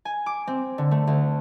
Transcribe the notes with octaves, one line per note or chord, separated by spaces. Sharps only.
G#5
D6
C4
D3
A3
D2